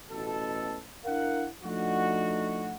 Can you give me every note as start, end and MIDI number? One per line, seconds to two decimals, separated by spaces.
0.10 0.79 33
0.10 0.79 47
0.10 0.79 69
1.05 1.45 62
1.05 1.45 64
1.05 1.45 70
1.05 1.45 77
1.05 1.45 78
1.63 2.77 53
1.63 2.77 57
1.63 2.77 62
1.63 2.77 63
1.63 2.77 66